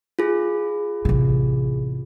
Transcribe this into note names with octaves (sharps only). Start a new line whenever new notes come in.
F4 G#4
A1 C3